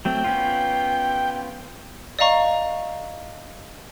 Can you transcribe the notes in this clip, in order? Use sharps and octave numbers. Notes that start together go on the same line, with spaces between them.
F#3 A3 C4 G5
B3 C#4 F4
D5 D#5 F5 A#5 C#6